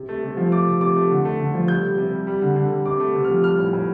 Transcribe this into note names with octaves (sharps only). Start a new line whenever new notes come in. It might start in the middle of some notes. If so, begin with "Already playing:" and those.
Already playing: C3
A3
C3
F3
A3 D6
C3
C3 D6
A3
D3
A3
D3
F3
G3 G6
C3
C3
G3
G3
D3
D3
G3
C3 D6
A3
C3
F6
F3
G3 F6
A2
A2